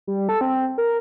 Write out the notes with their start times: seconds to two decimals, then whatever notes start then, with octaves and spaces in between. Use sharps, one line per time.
0.07 G3
0.29 A4
0.41 C4
0.78 A#4